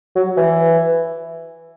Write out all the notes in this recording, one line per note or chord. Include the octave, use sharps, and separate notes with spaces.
F#3
E3